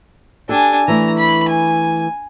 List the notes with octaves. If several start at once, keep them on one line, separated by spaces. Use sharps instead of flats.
D4 G4 A4 G#5
E3 A3 A#5
B5
G#5